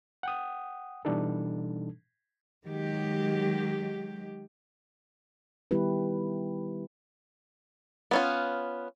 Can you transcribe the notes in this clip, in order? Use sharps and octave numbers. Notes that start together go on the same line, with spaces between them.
F#5 G5 D#6
B2 E3 G3 D4 D#4 A4
D#3 F#3 G#3 G4
D#3 G3 B3 E4 G4 B4
B3 C#4 F4